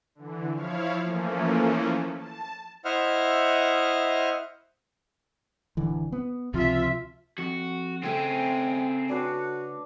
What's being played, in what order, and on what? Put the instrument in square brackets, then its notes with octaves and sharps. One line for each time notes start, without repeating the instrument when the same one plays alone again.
[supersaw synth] D3 E3
F3 E4 C#5 F5
E3 F3 A3 A#3 C#4
A5
[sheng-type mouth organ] E4 C5 D#5 E5 F#5 F6
[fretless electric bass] D1 D3 E3
B3
[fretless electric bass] C#2 C3 F3 [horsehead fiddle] F4 E5
[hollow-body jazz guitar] F2 [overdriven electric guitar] F#4
[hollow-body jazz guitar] C#3 A3 [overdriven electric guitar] C4 G#4 [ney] G5
[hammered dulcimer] D4 B4 C#5 [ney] F#4